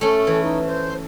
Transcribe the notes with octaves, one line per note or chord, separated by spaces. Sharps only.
A3 C#4 A4
E3
D#4
C5